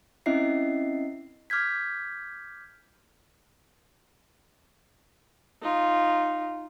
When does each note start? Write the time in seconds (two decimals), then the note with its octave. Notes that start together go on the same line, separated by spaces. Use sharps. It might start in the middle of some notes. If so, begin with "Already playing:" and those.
0.26 C4 C#4 E4 D#5 E5 C7
1.50 D6 F6 G6 G#6 B6
5.62 D#4 F4